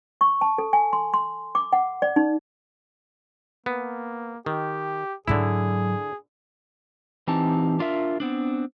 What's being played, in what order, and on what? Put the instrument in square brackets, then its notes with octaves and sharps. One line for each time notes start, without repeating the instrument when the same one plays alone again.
[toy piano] C#6
A5
A4
G#5
C6
C6
D6
F#5
D5
D#4
[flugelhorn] A#3 [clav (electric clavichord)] B3
[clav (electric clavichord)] D#3 [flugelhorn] G4
[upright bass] G#2 F#3 [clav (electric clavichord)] D3 E4 [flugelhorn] G#4
[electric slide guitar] E3 C4 D#4 G4 A5
D4 F4 A#4 E5
B3 C4 D4